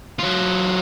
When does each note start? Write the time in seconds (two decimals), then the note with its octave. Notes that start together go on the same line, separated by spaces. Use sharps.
0.19 F#3 F4